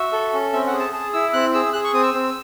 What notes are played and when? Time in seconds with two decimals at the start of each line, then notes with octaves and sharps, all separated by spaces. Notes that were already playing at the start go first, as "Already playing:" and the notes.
Already playing: F#4 E5
0.12 A4
0.33 C#4
0.53 C4 E5
0.67 F#5
0.73 G#4
0.79 A5
0.93 G#4 A5
1.13 E4 E6
1.33 C4 F#6
1.54 G#4 E6
1.73 G#4 F#6
1.84 C#6
1.93 C4 D#6
2.03 E6
2.14 C4